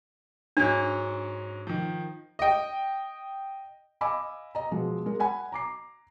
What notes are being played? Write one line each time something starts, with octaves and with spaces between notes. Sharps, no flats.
G#2 F#3 C#4 D4
D#3 F3
D#5 G5
D#5 F5 G#5 B5 D6 E6
D#5 A#5
B2 F3 G#3
G#3 A#4
F#5 G#5 B5
A#5 D6 C7